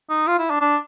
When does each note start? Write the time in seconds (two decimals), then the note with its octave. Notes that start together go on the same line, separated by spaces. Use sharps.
0.10 D#4
0.27 F4
0.39 E4
0.50 D4
0.61 D4